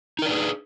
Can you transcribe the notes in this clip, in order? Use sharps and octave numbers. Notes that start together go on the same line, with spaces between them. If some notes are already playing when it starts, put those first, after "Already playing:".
D4 D#4 G#4 A#4 B4